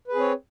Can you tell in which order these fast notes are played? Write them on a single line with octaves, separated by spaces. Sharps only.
B4 G#4 C4 C#5